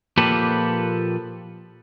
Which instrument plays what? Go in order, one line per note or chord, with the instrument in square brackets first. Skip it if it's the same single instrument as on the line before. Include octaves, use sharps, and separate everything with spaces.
[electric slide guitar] A#2 F3 A#3 G4 A4 B4